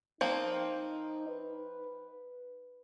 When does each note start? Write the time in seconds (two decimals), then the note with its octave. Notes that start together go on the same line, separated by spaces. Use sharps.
0.21 F3 A#3 C4 D#4
1.29 B4